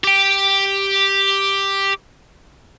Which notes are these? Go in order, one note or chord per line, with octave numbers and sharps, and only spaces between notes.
G4 G5